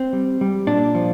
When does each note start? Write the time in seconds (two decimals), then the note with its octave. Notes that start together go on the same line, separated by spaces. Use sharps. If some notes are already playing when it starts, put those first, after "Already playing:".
Already playing: C4
0.13 G3
0.41 G3
0.67 A#2 D4
0.95 F3